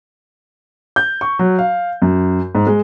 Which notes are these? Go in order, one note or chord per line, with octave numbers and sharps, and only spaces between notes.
G6
C#6
F#3
F5
F#2
G#2
G#3